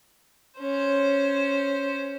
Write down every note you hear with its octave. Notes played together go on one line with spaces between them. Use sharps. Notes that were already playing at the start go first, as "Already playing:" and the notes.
C#4 C5